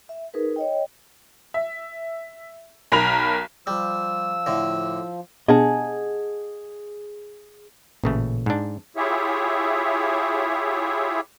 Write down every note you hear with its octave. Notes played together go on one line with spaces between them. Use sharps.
E5
D#4 G#4 A#4 B4
C#5 D#5 G5
E5
B1 A#4 A#5 B5 F7
F3 G3 E6
A2 D3
B2 B3 D4 G#4 D#5 F#5 A5
A1 A#2 C#3 A3
G#2 D4
E4 F4 G4 G#4 C#5 E5